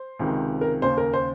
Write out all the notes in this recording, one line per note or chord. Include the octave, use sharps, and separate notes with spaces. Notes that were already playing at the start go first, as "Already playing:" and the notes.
Already playing: C5
C#2 C3 D#3
A#4
D#2 C#3 C5
A#4
C5